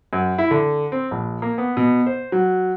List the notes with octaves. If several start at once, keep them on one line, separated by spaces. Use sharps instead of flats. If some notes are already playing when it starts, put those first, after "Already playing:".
F#2
E4
D3
C4
A#1
A#3
B3
B2
C5
F#3